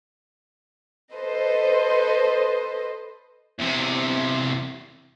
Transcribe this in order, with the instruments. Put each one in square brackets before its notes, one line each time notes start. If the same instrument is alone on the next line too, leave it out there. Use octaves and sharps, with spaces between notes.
[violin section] A4 B4 C5 D#5
[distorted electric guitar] E2 C3